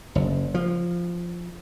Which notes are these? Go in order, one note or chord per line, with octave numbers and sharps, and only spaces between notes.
F#1
F3